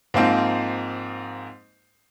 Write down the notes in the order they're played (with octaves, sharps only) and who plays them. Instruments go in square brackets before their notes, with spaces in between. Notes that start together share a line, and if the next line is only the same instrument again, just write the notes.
[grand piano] G#2 F3 A#3 C4 D#4 F4